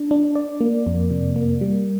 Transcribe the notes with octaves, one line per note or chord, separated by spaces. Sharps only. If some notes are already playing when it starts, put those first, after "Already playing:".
Already playing: D4
D4
D5
A#3
F2
C3
A#3
G3